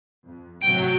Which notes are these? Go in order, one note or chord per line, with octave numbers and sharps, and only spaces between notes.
F2
A1 G#2 C3 F#3 G5 D7